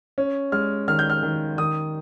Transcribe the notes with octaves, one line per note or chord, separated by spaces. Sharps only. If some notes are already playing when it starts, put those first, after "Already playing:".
C#4
G#3 F6
D#3 F6
G6
F6
D#3
D#3 D#6